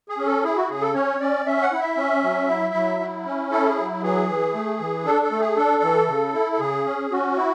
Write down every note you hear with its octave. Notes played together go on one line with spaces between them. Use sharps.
G#4
C#4
A4
E4 G#4
F#4
C#3 G#4
A4
C#4 C#5
C#4 D5
C#4 E5
F#5
E4
E5
C#4
F#3
E4
F#3
E4
C#4
E4 A4
G#4
F#3
E3 G#4
E3
A3
E3
D4 A4
A4
A3
G#4
D4 A4
E3
C#3
E4
A4
C#3 G#4
C#4
C#4 F#4
E4